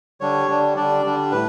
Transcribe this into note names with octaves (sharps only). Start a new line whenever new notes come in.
D3 G3 D4 C#5
D3 G3 D4
D3 G3 D4 D5
D3 G3 D4
A2 B4